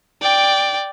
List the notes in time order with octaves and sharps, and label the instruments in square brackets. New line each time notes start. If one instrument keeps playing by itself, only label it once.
[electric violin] D5 G5